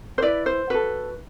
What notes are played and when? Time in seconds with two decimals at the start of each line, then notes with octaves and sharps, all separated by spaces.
0.18 C5
0.22 E4 B4 D5
0.46 C5
0.70 F#4 A4 B4